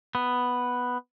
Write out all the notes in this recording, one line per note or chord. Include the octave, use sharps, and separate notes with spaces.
B3